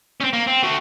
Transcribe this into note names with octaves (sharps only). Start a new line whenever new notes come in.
C4 C#4
A#3
C4
A3 F#4